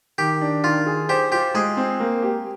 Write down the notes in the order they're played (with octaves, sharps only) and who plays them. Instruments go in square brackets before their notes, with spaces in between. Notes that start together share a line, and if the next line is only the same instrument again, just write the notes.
[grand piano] D#3 [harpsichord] G4
[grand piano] D4
[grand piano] D#3 [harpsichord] F4
[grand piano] G#4
[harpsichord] G4 [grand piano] C5
[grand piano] F4 [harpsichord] G4
[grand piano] G#3 [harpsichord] G#4
[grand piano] C4
A#3
G4